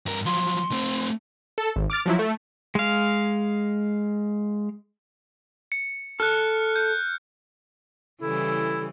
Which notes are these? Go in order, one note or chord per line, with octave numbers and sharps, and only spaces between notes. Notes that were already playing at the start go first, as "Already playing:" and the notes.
G2 A#4
F3 F#3 C6
A3 C4
A4
G#1
D6 F6 A6
F3 F#3 E4
A3
G#3 F5
C#7
A4 F6 F#6
G6
C#3 E3 G3 E4 A4